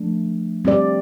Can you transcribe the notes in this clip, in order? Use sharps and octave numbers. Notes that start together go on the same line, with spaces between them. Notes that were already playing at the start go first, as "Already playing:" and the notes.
Already playing: F3 A3 D4
G3 C4 G4 D5